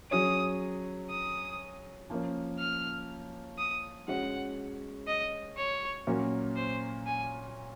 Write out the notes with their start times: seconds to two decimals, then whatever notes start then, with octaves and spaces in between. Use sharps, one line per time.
0.11 F#3 C#4 G#4 C#5 D#6
1.10 D#6
2.10 F3 A#3 C#4
2.59 F6
3.58 D#6
4.08 G#3 C#4 F#4 F#5
5.07 D#5
5.57 C#5
6.07 A#2 F#3 A#3 C#4 F#4
6.56 C5
7.07 G#5